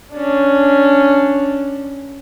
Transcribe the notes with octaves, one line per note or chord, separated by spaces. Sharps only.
C#4 D4